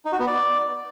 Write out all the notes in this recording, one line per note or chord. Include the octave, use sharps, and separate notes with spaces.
D#4
F#4
B3
D5